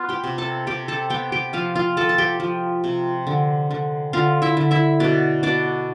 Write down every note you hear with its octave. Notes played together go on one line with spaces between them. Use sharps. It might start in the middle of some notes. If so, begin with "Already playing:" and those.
Already playing: B3 F4 F5
G4 G5
C3
A4 A5
C3 G4 G5
A4 A5
B3 G4 G5
G4 G5
F3 F4 F5
F4 F5
F3 A4 A5
A5
G4 G5
F3
C3
D3
D3
D3 F4 F5
E4 E5
D3
E4 E5
B2 D4 D5
B2 D4 D5